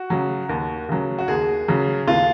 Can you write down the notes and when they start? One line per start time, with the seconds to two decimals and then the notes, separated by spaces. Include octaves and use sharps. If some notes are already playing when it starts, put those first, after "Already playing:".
Already playing: F#4
0.10 C#3 F#3
0.49 D#2
0.89 C#3 F#3
1.18 F#4
1.28 D#2 G#4
1.68 C#3 F#3
2.07 D#2 F4